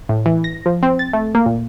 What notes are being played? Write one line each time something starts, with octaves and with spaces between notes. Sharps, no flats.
A2
E3
A#6
F3
C4
A6
A3
A#3
A#2